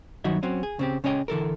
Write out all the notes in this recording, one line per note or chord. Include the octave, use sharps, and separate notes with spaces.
G2 D#3 F#3 D#4 F#4 E5
F#3 C4 C#4
G#4
C#3 C4 G4
C#3 C#4 C#5 D#5 G5
D3 E3 A4 A#4